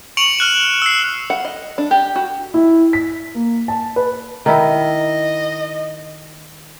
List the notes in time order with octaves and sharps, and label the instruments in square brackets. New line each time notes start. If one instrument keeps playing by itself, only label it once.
[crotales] C#6 C#7 D7 F7 F#7
F6 F#6 E7
E6 C7
[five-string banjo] F#5
D#5
D4
G4
F#4
[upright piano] E4
B6
A#3
A5
B4
[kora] D#3 E4 [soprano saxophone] D#5